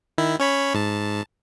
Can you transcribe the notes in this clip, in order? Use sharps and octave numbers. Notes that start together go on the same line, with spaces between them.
D#3 E4
C#4 C#5 B5
G#2 A5